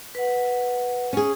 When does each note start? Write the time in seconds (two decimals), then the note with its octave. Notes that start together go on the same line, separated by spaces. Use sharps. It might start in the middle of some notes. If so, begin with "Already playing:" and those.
0.15 B4 F#5
1.13 C#4 G#4